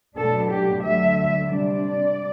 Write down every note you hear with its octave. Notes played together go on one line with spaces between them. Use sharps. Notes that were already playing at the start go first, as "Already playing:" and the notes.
B2 F#3 A3 D4 A4
G4
D2 D3 F#3 A3 E5
C3 G3 D4 D5